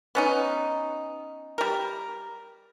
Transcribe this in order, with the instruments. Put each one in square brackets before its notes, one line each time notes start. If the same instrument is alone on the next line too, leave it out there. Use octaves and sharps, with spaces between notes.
[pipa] B3 C#4 D#4
G3 A#4